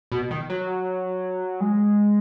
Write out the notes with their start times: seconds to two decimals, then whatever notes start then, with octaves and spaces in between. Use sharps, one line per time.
0.12 B2
0.31 D#3
0.50 F#3
1.60 G#3